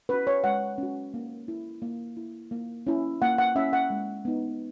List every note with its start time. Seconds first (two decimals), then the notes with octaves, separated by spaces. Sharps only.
0.09 C#4 F#4 B4
0.27 C#5
0.44 G#3 F#5
0.78 C#4 F#4
1.14 A#3
1.48 E4
1.82 A#3
2.17 E4
2.51 A#3
2.87 C#4 E4
3.22 A#3 F#5
3.38 F#5
3.56 C#4 E4 E5
3.73 F#5
3.90 G#3
4.25 B3 D#4